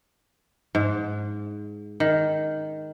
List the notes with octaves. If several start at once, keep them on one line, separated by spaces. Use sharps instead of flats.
G#2
D#3